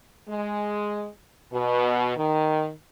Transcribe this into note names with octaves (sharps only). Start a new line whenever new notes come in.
G#3
B2
D#3